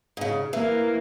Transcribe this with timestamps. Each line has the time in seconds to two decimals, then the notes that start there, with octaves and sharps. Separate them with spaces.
0.17 G#2 C#3
0.53 E3 A#3